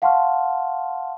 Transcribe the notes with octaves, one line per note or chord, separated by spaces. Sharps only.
F5 F#5 A5 C6 C#6 F6